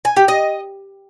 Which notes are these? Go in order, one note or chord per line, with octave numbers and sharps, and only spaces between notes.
G#5
G4
D#5